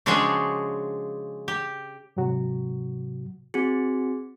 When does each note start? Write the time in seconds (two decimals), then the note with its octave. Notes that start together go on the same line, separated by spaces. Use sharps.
0.06 C#3 F3 G#3 D4 F#4 G#4
1.48 G4
2.17 G#2 C3 F#3 F#4
3.54 C4 F#4 G#4